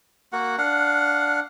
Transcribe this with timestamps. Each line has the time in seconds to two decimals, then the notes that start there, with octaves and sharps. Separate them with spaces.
0.32 A#3 F#4 F#5
0.58 D4 F5 F#5